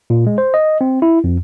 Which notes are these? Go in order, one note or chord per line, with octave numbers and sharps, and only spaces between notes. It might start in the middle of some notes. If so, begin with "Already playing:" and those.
A#2
G#3
C5
D#5
C4
E4
F2